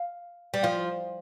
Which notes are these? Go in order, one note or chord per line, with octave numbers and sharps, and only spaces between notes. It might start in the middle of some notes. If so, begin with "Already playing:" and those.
Already playing: F5
G3
F3 F5